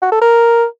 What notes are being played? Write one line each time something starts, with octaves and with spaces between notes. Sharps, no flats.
F#4
A4
A#4